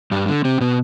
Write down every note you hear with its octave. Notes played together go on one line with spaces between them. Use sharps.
G2 G3
D3
C3 C4
B2 B3